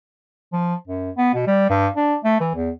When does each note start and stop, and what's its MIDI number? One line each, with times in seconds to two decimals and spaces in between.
0.53 0.75 53
0.87 1.11 42
1.17 1.34 59
1.34 1.46 47
1.47 1.69 55
1.70 1.88 43
1.96 2.16 62
2.24 2.38 57
2.40 2.53 52
2.55 2.70 40